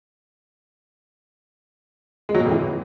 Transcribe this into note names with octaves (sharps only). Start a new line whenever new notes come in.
G#3
F#3
A#2
F2
E3